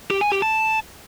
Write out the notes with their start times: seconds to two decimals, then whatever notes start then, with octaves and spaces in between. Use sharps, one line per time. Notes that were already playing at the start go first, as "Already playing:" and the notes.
0.11 G4
0.21 G#5
0.32 G4
0.42 A5